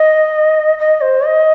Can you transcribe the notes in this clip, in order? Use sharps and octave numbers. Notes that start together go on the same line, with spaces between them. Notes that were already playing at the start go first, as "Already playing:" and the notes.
Already playing: D#5
D#5
C5
D#5